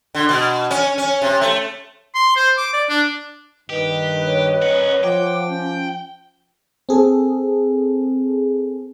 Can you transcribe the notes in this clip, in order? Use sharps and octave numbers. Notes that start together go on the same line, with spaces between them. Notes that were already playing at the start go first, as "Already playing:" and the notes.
D3
B2
C#4
C#4
C3
A3
C6
C5
D6
D5
D4
G2 D#3 G4 B4 D#5
C#5
C#4 A#4 F#5
F3 C5 F#5 G5 D6
C#4 G6
C4 G#4 A4